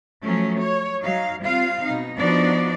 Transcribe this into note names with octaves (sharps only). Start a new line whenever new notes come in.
F3 F#3 A3 C#4
C#5
F#3 D#4 F5
G3 C4 F4 F5
B2 D#4
F3 B3 D4 D#4 F#4 D5